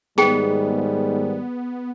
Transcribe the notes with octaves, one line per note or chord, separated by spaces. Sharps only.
G#2 D#3 G3 B3 G#4 G5